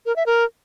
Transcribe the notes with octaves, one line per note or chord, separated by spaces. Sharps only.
A#4
E5
A#4